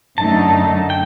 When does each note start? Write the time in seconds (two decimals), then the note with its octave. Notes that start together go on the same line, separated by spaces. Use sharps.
0.18 F#2 D3 A3 D#4 A5
0.90 G5